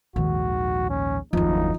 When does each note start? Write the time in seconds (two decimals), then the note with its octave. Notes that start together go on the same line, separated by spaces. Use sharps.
0.16 A#1 D#2 G#2 D#3 F#4
0.89 C#4
1.33 F#1 D#2 F3 D#4